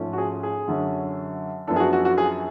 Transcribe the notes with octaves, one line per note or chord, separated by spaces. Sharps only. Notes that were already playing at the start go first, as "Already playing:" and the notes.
Already playing: G#2 F3 A3 C#4
F#4
G#4
G#4
F#2 D3 F#3 C#4
F#2 F3 B3 D4 A4
G#4
F#4
F#4
F#4
G#4